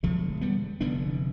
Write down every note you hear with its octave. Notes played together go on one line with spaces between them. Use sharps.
E1 D2 D3 F3 A3
G3 B3
F1 E2 D3 B3 D4